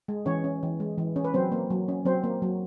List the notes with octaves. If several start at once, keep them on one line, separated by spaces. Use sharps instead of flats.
G#3
E3 C#4 C#5
C#4
E3
G#3
E3
C#4
B4
F#3 C4 C5
A#3
F#3
C#4
F#3 C4 C5
A#3
F#3